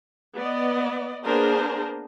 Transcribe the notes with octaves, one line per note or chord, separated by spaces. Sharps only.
B3 D5 D#5
A#3 B3 D4 G#4 A#4 C5